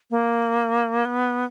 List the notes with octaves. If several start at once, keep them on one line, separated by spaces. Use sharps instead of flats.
A#3
B3